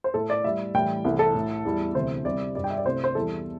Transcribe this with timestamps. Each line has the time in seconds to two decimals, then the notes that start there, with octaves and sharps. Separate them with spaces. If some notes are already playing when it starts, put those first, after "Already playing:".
0.04 C5
0.14 A2 A3 A4
0.30 D5
0.44 A2 G3 E5
0.74 A2 E3 G3 G5
1.05 C2 C3 E3 A3
1.19 A4
1.35 A2 A3
1.65 E2 E3 G3
1.95 D2 C3 E3 C5
2.25 C2 C3 G3 D5
2.55 G2 G3 D5
2.64 G5
2.70 E5
2.78 D5
2.84 C2 C3 A3 C5
3.04 C5
3.15 E2 E3 G3 A4